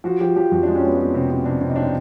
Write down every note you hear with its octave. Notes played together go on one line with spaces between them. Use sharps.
F3 F#4
F3 G4
F3 G4
F2 F#4
D4
G#3
C#4
G#3 B3
F3 C4
C3
C3
C3 D4
C3
D#4
C3 D4
D#4